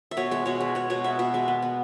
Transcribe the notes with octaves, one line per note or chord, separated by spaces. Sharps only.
E5
B2 C#5
G#3 E5
B2 C#5
G#3
G#3 C#5
B2 C#5
B3 E5
B2 E5
G#3 E5
B3
B3